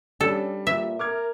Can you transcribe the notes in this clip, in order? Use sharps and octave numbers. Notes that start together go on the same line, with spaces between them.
G3 C#4 D4 A4
A#2 E5
A#4 D6 F6 G#6